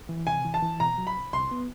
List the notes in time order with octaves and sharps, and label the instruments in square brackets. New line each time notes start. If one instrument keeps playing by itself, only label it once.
[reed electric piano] E3
[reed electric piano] C3 [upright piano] G#5
[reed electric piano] E3
[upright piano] A5
[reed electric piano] E3
[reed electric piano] B2 [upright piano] A#5
[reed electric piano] F#3
[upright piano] B5
[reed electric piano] C2
[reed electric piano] C2 [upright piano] C6
[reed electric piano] B3